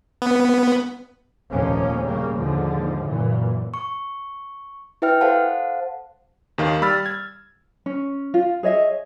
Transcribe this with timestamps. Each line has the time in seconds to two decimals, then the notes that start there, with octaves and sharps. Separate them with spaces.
0.22 B3
1.51 F1 A#1 D#2 F3 A#3 C#4
2.05 C#3 G3 A#3
2.36 D#2 G#2 D3 F3
3.07 F#2 A#2 E3
3.74 C#6
5.02 E4 B4 E5 G5 F6
5.21 A4 C5 F5 F#5 A5
6.58 D#2 D#3 F5
6.82 G3 B5 E6 F6 A6
7.06 G#6
7.86 C#4
8.34 F4
8.63 G#4 C#5 D#5 E5